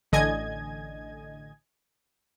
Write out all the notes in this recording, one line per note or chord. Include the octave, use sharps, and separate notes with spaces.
A1 D3 D#5 G#5 G#6